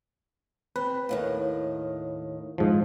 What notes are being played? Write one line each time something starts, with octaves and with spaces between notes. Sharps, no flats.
C4 B4
D#2 A2 D#3
G#2 F3